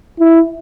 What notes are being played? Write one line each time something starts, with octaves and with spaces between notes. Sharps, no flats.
E4